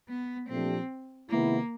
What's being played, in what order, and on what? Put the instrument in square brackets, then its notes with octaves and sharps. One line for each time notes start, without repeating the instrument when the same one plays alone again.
[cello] B3
[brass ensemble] A#2 F3 A3 D4 G4 [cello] C4
[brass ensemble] C3 D#3 G#3 B3 E4 [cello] A#3